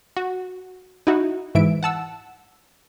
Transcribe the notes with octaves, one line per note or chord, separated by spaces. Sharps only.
F#4
D#4 E4 F#4
G#2 E3 E5 D7
F#5 A5 E6